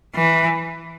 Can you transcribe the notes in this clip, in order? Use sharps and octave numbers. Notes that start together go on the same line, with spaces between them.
E3